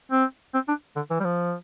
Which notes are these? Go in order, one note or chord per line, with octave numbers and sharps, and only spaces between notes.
C4
C4
D4
D3
E3
G3
F3